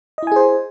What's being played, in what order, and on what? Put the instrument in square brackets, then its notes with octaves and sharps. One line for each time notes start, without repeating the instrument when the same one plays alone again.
[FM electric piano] D#5
E4
G#5
G#4
C5